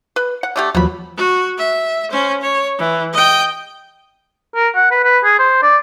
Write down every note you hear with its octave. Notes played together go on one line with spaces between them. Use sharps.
B4
F#5
D3 A3 G4
D#2 B2 F3 F#3 B5
F#4
E5
C#4 C5
C#5
E3
D#5 G5
A#4
F#5
B4
B4
G#4
C5
D5